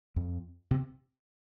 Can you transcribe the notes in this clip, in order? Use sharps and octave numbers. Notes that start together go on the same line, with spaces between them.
F2
C3